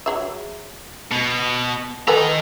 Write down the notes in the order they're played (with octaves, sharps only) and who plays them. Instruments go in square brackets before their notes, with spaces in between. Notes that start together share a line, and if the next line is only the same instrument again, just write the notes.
[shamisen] F#3 G#4 E5
[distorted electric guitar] B2
[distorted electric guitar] D#3 A#5 [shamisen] A4 B4 G#5